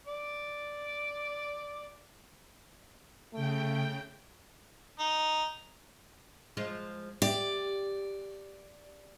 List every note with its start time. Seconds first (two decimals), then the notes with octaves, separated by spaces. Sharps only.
0.07 D5 D6
3.33 C#3 A3 G5
4.99 D#4
6.57 F3 G#3 F4
7.22 G4 D5